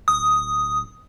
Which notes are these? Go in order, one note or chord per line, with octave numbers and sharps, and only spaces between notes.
D1 D#6